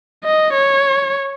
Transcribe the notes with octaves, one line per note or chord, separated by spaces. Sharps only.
D#5
C#5